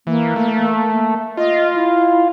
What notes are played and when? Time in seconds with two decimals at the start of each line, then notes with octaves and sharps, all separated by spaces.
0.07 E3 A#3
0.36 A3
1.37 F4 D#5
1.76 E4